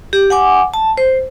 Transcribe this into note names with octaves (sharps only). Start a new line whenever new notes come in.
G4
F#5 G#5 D6
A5
C5